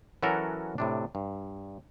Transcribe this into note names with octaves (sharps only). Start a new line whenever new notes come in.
E3 F#3 C#4 F#4 A4 A#4
A2 C3 D4
G2